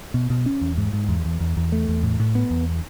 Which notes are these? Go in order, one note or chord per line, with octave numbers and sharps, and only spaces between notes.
B2
B2
C#4
E2
G#2
G#2
E2
E2
E2
E2
A3
E2
A2
A2
B3
E2